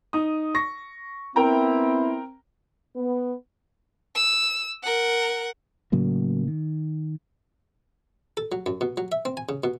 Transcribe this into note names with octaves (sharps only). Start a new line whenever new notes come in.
D#4 D#6
C#6 A#6
B3 C4 E4 A#4 G5 A#5
B3
E6
A#4 F#5
A2 C#3 F#3 A#3
D#3
A4
F#3
F#2
B2
F#3
E5
C4
G#5
C#3
B2